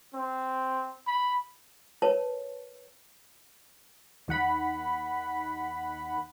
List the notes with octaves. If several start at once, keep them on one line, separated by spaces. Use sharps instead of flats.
C4
B5
A#4 B4 C#5 A5
D#2 D#3 F#5 B5